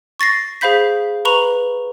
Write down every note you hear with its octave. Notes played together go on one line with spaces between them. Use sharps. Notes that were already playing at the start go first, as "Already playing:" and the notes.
C#6 A6 A#6 C7
G#4 C5 F5 B5 G6 B6
B4 A#5 B5 C#6 F7